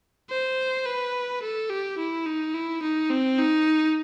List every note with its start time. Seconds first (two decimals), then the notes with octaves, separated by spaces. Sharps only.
0.30 C5
0.86 B4
1.42 A4
1.70 G4
1.98 E4
2.26 D#4
2.54 E4
2.82 D#4
3.10 C4
3.38 D#4